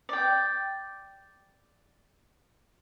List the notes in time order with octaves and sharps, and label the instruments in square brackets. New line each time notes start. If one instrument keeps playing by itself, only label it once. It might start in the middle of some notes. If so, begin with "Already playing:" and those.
[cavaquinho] D5 G5